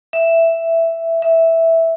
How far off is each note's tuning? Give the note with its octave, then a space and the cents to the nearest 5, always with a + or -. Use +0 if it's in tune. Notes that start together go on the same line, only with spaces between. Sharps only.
E5 +5
E5 -5